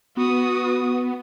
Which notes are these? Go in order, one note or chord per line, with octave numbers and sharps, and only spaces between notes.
B3 F#4 D#6